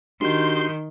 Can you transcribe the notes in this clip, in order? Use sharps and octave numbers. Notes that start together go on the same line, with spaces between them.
D#3 D4 F#4 G4 C6 G6